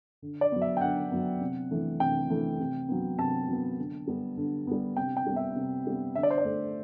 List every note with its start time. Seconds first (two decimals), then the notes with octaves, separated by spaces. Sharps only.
0.22 D3
0.41 D5
0.52 F#3 B3
0.62 E5
0.77 G5
0.81 D3 F#5
1.12 F#3 B3
1.41 C3
1.71 E3 A3
2.00 C3 G5
2.30 E3 A3
2.60 C3
2.89 F#3 B3
3.19 C3 A5
3.48 F#3 B3
3.79 D3
4.07 G3 B3
4.37 D3
4.67 G3 B3
4.97 C3 G5
5.17 G5
5.27 G3
5.32 B3 E5
5.56 C3
5.87 G3 B3
6.15 D3 E5
6.23 D5
6.30 C5
6.38 D5
6.45 A3